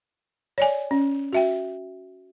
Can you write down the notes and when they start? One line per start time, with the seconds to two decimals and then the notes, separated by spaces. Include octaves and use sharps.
0.58 C#5 D5 G#5
0.91 C#4
1.33 F#4 E5 G5